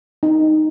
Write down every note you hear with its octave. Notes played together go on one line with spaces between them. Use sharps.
D#4